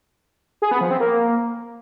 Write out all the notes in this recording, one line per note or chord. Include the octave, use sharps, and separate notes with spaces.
G#4
B3
F3
C4
A#3